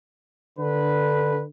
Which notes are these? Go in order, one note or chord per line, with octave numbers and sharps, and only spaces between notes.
D3 B4